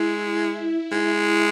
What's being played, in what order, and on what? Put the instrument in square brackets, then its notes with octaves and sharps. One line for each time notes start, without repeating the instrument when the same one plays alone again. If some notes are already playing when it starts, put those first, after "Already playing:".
Already playing: [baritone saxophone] G#3 [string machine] E4
[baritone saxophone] G#3